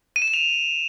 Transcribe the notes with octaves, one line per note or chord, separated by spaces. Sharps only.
D#7
E7
D#7
F7